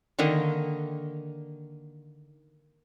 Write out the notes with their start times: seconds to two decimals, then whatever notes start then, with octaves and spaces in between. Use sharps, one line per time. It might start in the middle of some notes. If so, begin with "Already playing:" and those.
0.19 D3 D#3 A#3 D#5